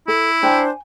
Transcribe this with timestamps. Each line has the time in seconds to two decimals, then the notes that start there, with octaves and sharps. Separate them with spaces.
0.08 E4 A4
0.43 D4 C5 G5 G#5